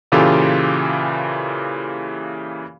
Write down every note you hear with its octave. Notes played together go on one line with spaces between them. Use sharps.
A#2 C#3 E3 F4 G4 A4